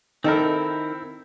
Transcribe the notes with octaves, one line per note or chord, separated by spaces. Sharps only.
D#3 C4 D#4 E4 A4 A#4